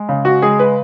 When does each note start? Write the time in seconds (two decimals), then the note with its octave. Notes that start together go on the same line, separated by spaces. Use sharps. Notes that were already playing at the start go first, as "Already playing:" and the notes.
Already playing: G#3
0.09 C#3
0.25 F#4
0.42 G#3 G#4
0.59 B4